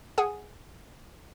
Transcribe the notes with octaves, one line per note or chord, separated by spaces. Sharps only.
G#4 F#5 G#5